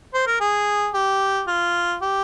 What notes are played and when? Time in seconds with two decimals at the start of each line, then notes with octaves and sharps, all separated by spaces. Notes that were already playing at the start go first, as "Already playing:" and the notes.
0.14 C5
0.27 A#4
0.40 G#4
0.94 G4
1.47 F4
2.02 G4